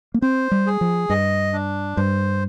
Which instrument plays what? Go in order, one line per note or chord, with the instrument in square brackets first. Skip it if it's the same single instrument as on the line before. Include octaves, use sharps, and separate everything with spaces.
[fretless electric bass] A#3
[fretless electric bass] C4 [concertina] C5
[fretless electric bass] G3
[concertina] G#4
[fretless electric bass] F3
[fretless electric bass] G2 [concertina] D#5
[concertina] D4
[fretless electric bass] G2 [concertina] C5